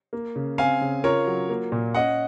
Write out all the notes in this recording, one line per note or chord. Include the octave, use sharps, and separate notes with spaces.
A#3
C#3
C4 F5 G#5
C#3
F4 A#4 C#5
F#3
A#3
A#2
C#4 D#5 F#5